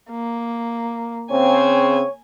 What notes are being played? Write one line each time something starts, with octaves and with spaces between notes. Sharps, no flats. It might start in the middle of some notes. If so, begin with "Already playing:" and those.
A#3
C#3 C4 C#5 G#5